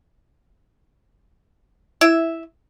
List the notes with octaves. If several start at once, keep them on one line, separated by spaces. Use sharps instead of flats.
E4 E5